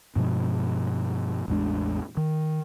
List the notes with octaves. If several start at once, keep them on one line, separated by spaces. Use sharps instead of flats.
G2 B2 F3 G#3
A1 E2 G#3 D4
D#3